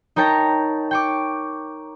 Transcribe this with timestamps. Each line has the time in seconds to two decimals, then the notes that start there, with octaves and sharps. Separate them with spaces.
0.16 D#4 A#4 C#5 G5 A5 A#5
0.91 G5 C#6 D6